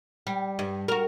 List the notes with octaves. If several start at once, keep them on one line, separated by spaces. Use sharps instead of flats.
G3
G2
F#4 A#4